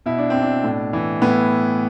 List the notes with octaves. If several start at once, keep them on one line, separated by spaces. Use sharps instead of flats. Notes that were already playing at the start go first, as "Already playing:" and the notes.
B2 E4
D4
C4
B2
D4
A2
E3
A2 B3